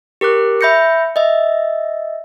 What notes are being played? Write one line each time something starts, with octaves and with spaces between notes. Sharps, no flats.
G4 A#4 D6 F#6
E5 B5 G6 A#6 C#7
D#5 E5